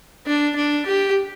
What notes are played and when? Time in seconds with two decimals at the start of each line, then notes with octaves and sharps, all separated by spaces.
0.27 D4
0.56 D4
0.86 G4